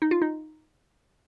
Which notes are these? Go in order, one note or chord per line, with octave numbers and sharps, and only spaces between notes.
D#4
F4
D#4